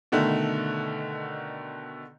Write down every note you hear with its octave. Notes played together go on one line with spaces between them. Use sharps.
B2 D3 D#3 A3